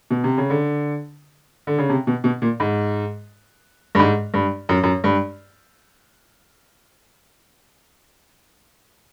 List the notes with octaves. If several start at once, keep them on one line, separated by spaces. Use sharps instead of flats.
B2
C3
C#3
D3
D3
C#3
C3
B2
B2
A#2
G#2
G2
G#2
G2
F#2
F#2
G2